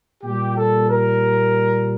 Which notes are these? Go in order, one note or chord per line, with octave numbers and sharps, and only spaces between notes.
A#2 G3 G4
A4
A#4